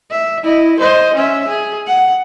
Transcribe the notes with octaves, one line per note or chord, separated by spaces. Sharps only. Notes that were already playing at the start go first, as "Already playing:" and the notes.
E5
E4 D#5
C5 D#5
C#4 E5
G#4
F#5